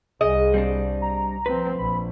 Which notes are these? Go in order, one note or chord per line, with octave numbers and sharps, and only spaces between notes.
C2 G#4 D#5
G3 C4 D4
A#5
F3 C4 B4
A#1 B5